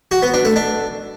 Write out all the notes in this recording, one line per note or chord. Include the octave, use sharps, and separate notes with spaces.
F#4
B3
D4
A3
D4